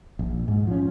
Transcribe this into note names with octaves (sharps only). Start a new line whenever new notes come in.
A#1
G#2
F3 C#4